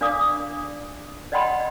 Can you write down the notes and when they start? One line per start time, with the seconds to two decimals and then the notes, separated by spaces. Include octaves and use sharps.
0.01 D4 D5 F5 D6 D#6
1.32 D5 D#5 F#5 G5 B5 C6